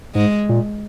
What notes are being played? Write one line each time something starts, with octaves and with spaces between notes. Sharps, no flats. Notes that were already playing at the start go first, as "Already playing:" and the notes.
G#2 G#3
A#2